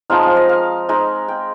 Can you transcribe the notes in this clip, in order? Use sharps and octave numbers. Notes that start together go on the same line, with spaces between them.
F3 G#3 C4 D#4 F5
F5
D#5
F5
G#3 D#4
G5